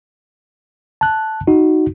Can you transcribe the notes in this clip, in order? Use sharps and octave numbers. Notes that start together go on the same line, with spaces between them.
A5 F#6
D#4 F#4